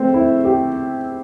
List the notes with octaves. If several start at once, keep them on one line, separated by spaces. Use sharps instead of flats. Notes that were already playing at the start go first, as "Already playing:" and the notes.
Already playing: A3 C4
E4
G4